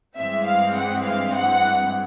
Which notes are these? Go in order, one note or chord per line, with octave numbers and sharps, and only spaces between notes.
G2 E3 G#3 C4 E5
F5
F#5
F5
F#5